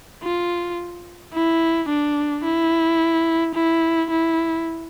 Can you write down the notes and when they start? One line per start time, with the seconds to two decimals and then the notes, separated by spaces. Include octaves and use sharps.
0.23 F4
1.33 E4
1.89 D4
2.44 E4
3.55 E4
4.11 E4